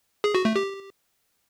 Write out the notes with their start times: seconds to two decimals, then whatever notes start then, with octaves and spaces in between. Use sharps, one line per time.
0.24 G#4
0.35 F#4
0.45 A3
0.56 G4